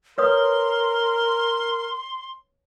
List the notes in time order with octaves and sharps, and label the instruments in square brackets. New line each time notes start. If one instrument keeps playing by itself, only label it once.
[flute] A#4 [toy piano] B4 C#5 D#6 [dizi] C6